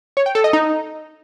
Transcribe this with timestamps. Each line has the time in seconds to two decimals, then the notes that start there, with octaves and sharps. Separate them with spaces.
0.17 C#5
0.26 G5
0.35 A4
0.44 D#5
0.53 D#4